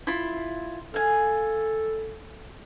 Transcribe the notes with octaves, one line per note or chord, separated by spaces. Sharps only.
E4 F4
A4 F5 G#5